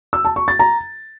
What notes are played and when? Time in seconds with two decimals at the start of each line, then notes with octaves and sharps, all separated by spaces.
0.13 E6
0.25 A5
0.36 C#6
0.48 A6
0.59 A#5